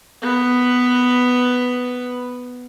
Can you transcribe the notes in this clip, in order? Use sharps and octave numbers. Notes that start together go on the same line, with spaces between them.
B3 B4